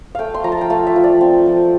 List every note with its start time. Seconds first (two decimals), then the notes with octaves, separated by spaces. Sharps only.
0.15 A3 F5 G5
0.34 C6
0.44 F3 A#5
0.52 A5
0.61 G5
0.70 A3 F5
0.87 E5
0.96 F3
1.04 D5
1.21 C4
1.46 F3